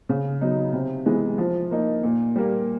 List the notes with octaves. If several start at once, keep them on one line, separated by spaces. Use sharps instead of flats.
C#3
F#3 B3 D#4
C3
E3 G#3 B3
F3
A#3 D#4
A#2
G3 A#3